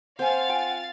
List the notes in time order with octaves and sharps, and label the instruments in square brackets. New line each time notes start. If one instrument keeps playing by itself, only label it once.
[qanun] C4 [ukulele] C5 G#5 [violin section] F5 A6 [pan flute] F#5
[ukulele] F4 G5 G#5